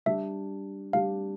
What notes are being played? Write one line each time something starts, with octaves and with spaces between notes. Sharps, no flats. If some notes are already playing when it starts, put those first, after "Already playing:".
G3 D4 G4 E5
G3 D4 G4 F5